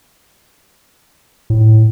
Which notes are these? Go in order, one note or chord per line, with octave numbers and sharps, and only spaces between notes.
A2